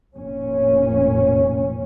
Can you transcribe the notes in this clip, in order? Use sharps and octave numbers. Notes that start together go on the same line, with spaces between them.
F1 A#2 C#4